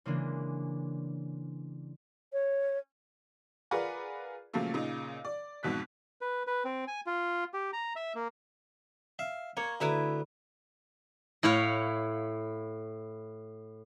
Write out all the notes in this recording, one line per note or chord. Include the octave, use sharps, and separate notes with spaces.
C#3 E3 G#3 A#3 D4
C#5
F4 G#4 A#4 B4 D5 F#5
A#2 C#3 F3 F#3 A3 A#3
A#2 C#3 D#4
D5
F2 G#2 B2 F#6 B6
B4
B4
C4
G#5
F4
G4
A#5
E5
A#3
E5 F5
A#3 C#5
D2 E4 B4 E5 A#5
A2 E4 C#5 F5